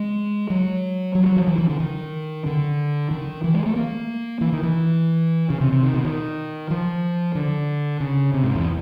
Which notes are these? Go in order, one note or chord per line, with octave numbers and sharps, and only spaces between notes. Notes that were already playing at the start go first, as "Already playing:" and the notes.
Already playing: G#3
F#3
F#3
F#3
F3
E3
E3
D3
D#3
D3
D#3
E3
G#3
A3
A#3
E3
D#3
E3
C#3
C3
C3
D#3
B2
D#3
F3
D3
C#3
C3
G#2
E2